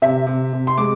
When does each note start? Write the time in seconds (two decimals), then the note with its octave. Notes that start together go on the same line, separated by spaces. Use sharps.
0.02 C3 E5
0.27 C3
0.53 C3
0.67 C6
0.78 G#3 D6